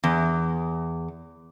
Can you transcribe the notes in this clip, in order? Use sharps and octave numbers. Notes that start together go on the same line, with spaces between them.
E2